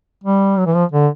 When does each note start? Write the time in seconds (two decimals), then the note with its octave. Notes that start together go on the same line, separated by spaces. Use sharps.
0.24 G3
0.58 F#3
0.66 E3
0.75 F3
0.92 D3